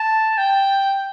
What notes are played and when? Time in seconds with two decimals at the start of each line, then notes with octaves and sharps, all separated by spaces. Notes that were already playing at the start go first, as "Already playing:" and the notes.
Already playing: A5
0.38 G5